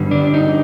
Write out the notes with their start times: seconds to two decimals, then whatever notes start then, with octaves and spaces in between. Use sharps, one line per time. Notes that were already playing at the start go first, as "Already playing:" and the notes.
Already playing: G2 D3 G3
0.11 D4
0.34 D#4